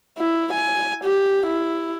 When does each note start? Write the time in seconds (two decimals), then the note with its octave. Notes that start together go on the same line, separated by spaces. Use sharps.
0.18 E4
0.53 G#5
1.04 G4
1.47 E4